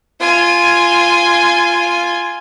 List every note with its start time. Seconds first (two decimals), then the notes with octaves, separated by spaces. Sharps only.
0.20 F4 G#5